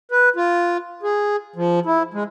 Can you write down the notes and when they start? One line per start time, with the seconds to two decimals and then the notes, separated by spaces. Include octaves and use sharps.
0.11 B4
0.36 F4
1.03 G#4
1.56 F3
1.86 E4
2.14 G#3